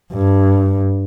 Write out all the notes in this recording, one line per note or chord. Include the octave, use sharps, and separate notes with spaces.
G2